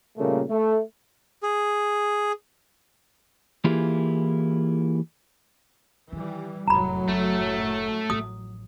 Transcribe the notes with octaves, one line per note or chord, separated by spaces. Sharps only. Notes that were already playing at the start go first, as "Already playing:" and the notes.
A#2 C#3 G3 A3 A#3
A3
G#4
E3 A#3 E4 F4 G4 G#4
D#3 E3 G3
F1 F#2 A2 F#3 A#5 B5
F#1 A3
A1 F3 D#6